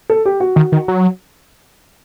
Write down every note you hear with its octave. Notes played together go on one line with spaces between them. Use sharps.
A4
G4
F#4
D#3
D#3
F#3